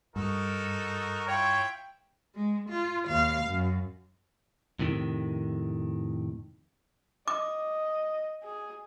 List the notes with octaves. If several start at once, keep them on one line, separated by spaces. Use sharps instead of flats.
G2 D#4 F#4 A4 A#4
E4 F4 C#5 G5
G#3
F4
D#2 F5
F#2
F2 A2 C3 D#3
D#5 D6
G#4